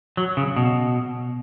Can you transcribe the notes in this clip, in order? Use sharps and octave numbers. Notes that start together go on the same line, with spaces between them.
F#3
C#3
B2